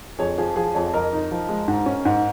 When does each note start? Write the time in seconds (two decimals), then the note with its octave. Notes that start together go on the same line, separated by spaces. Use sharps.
0.19 F2 G#4 C#5
0.38 F3 G#4
0.56 F3 G#4
0.75 F2 G#4 C#5
0.94 F2 A#4 D#5
1.13 D#4
1.31 F3
1.49 G#3
1.68 G#2
1.86 C#4
2.05 G#2